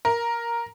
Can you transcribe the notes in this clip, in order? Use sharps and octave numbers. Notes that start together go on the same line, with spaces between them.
A#4